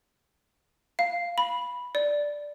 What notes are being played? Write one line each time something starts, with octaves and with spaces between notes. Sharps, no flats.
F5
B5
D5